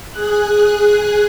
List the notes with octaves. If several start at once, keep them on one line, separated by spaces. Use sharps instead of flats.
G#4 F#6